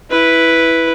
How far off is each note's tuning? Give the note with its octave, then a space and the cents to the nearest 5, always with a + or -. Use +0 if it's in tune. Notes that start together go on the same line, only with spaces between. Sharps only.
E4 +0 B4 +0